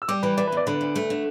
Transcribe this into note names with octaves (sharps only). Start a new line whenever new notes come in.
E6
G3 D6
E3 B4
E3 D5
B4
E2 D5
D3 B4
D2
A3
D3